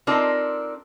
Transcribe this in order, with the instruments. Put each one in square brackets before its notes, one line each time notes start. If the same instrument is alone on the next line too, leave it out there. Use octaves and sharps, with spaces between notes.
[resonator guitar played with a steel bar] C4 D4 D#4 F4 A4 A#4